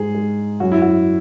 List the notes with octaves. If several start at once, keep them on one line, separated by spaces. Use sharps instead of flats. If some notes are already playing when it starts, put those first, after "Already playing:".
Already playing: G#2 G#3 G#4
G#3
F#2 F#4
E4
F#4